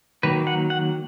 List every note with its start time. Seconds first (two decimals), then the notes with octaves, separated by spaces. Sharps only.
0.23 D#3 F#3 A#3 B4
0.47 F#5
0.70 F#5